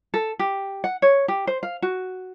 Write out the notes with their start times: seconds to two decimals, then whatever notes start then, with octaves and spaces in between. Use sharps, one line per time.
0.14 A4
0.39 G4
0.84 F#5
1.02 C#5
1.28 G4
1.47 C5
1.63 F5
1.82 F#4